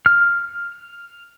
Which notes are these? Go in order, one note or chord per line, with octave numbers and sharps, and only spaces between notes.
F6